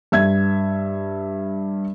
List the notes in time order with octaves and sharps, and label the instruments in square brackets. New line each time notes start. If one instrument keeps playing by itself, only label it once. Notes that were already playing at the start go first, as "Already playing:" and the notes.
[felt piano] G2 E5 G#6